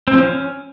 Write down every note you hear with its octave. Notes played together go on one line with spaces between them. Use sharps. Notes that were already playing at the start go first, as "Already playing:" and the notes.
C4
F3
C#4